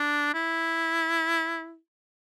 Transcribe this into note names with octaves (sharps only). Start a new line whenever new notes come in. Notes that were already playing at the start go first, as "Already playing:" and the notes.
Already playing: D4
E4